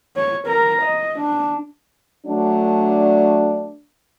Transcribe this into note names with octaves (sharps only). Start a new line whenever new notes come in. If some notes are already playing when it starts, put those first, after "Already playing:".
C#5
A#4 A#5
D#5
D4
F#3 A3 D4